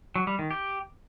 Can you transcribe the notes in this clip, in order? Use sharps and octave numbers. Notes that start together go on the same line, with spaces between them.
F#3
G3
D#3
G4